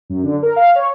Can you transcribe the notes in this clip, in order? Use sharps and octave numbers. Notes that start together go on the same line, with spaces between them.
F#2
D3
A#4
F5
C#5